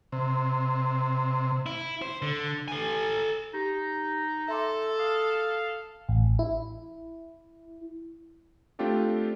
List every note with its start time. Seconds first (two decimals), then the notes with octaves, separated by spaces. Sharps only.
0.12 C3
1.66 E4
2.02 C5
2.22 D3
2.68 A4 G#5
3.54 D#4 G4
4.48 A4 E5 C6 D6
4.99 F5 D#6
6.09 A1
6.39 E4
8.79 A3 C4 D4 F4 G4 A4